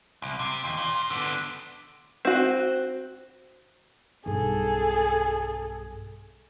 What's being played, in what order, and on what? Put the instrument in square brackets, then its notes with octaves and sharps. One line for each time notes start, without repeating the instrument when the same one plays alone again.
[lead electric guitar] C2
C3
D#2
A#2 F4
D3 B3
[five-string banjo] C4 F#4
[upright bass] B1 G2 [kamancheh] G#4 A4